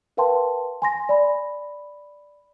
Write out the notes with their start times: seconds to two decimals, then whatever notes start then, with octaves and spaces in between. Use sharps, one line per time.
0.17 A#4 B4 F5 G5 A5 C6
0.82 G#5 C6 A#6
1.09 D5 B5